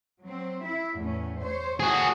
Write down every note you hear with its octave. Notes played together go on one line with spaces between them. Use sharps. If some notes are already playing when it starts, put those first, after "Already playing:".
F#3 C4
E4 E5
E2 A2 C#4
C5 C#5
A3 F#4 G#4 C#5